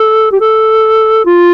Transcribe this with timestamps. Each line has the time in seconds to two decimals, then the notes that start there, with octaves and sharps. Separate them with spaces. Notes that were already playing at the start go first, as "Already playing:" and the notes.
Already playing: A4
0.32 G4
0.40 A4
1.25 F4